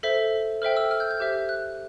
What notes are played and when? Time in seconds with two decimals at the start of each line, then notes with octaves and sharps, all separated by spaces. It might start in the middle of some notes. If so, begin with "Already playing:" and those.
0.03 A4 C5 E5 B6
0.62 A4 C5 E5 G5 F6
0.77 E6
0.91 F6
1.00 G6
1.11 G6
1.20 G4 C5 E5
1.49 F#6